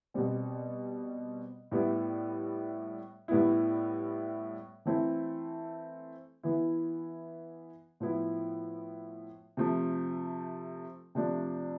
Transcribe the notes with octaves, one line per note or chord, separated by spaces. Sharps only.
B2 G3 C4
A2 G3 B3 E4
A2 G3 B3 E4
E3 A3 C4 E4
E3 B3 E4
A2 F3 B3 E4
C3 F3 A3
C3 F3 A3 D4